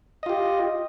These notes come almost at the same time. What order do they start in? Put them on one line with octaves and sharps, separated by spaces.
D#5 F4 G4